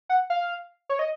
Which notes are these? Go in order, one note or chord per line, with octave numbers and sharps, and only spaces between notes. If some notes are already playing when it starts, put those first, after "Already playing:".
F#5
F5
C#5
D#5